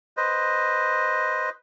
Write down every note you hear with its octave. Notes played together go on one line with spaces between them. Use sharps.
B4 C5 D#5